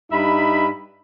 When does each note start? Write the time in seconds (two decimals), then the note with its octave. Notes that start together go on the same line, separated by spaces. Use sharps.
0.12 G2 D#4 E5 B5